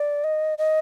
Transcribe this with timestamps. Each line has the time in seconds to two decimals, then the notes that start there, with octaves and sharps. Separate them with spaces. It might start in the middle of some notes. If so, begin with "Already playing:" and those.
Already playing: D5
0.24 D#5
0.58 D#5